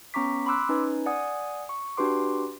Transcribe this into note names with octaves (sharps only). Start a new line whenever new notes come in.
B3 C#4 A#5 C#6 D6 B6
B5 C6 D6 E6 F#6
C#4 D#4 B4 G#5
D5 F#5 G#5 D#6
C#6
D4 F#4 G4 B4 C6 D6